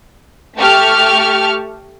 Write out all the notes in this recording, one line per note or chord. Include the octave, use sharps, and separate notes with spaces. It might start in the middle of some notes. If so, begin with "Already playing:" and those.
A3 G4 A5 C#6 F6